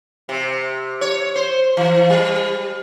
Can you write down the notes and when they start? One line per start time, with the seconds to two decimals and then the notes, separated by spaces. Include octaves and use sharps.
0.29 C3
1.01 C#5
1.36 C5
1.77 E3
2.10 G3